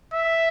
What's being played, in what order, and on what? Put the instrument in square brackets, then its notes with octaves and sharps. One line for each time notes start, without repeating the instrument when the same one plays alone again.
[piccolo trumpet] E5